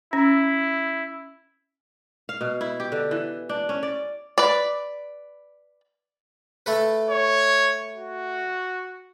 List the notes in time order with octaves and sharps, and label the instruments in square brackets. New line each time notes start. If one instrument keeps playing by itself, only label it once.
[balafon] C#4 [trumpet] E4
[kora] F5
B2
E4
G4
D3
E3
D4
C#4
D5
[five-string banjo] B4 D5
[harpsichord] A3 A4 B4
[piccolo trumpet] C#5
F#4